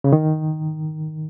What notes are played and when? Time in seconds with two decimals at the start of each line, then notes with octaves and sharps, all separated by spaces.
0.04 C#3
0.13 D#3